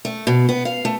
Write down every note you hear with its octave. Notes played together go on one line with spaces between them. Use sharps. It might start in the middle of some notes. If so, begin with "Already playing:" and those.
A3
B2
B3
F5
A3